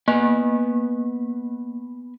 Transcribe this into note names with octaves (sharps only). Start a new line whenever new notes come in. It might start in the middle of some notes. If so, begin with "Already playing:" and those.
A#3 B3 B4 G#5